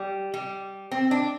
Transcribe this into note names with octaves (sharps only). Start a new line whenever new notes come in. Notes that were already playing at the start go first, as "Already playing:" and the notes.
Already playing: G3
G3
C4
D4